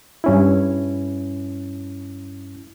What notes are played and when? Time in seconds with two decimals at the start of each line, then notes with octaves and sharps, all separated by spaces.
0.24 G2 C#4 E4